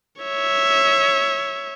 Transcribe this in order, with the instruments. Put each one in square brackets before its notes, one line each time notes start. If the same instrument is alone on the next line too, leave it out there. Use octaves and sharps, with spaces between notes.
[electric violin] C#5 E5